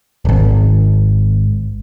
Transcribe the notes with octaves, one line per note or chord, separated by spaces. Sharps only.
D1 G#1